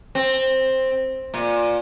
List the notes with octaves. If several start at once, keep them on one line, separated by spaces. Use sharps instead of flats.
C4
A#2